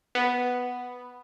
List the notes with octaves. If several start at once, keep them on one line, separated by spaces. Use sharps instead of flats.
B3